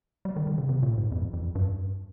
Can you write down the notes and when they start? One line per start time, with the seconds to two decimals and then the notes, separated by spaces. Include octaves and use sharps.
0.25 G3
0.36 D#3
0.47 D#3
0.58 C#3
0.69 C3
0.83 A#2
0.97 G#2
1.12 F2
1.33 F2
1.55 G2